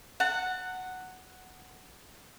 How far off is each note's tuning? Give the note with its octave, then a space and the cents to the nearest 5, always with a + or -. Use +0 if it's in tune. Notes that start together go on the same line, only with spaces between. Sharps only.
F#5 +0 A5 +45